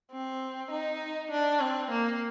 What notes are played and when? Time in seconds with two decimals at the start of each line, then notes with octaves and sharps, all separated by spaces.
0.11 C4
0.71 D#4
1.31 D4
1.60 C4
1.90 A#3